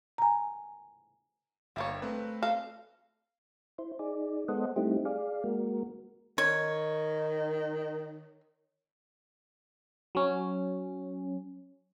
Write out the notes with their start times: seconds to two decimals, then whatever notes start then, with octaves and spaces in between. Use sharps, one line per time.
0.18 G#5 A#5
1.76 G1 G3 A#3 C#5 E5
2.02 A3 C4 B4
2.43 A4 F5 A#5
3.78 E4 C5
3.99 D#4 G#4 D5
4.48 G#3 B3 A4 C5 D#5 F#5
4.76 G3 A3 C4 D#4 E4 G4
5.05 G#4 D5 F5
5.44 G#3 A#3 F#4 A#4
6.38 D#3 C#5
10.15 F#3 C#4